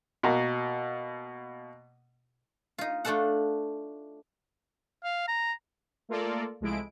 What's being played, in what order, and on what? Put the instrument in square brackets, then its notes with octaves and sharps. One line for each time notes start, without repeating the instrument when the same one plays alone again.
[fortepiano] B2 A#3 A#5
[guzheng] D#4 F4
A3 D4 F4 A4 F#5
[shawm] F5
A#5
[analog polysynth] A3 A#3 F4 A4 A#4 D5
C2 F3 G#3 A3 E4 D7